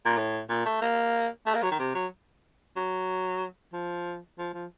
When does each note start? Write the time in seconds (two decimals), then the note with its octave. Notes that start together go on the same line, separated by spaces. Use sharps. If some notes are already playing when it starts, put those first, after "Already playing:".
0.06 A#2
0.17 A2
0.49 A#2
0.66 A3
0.82 A#3
1.46 A3
1.54 A#3
1.63 F#3
1.71 D#3
1.79 C3
1.95 F#3
2.77 F#3
3.73 F3
4.39 F3
4.54 F3